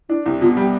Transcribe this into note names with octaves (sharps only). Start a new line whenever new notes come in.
D4 E4
C2 E4
B2 F4
G3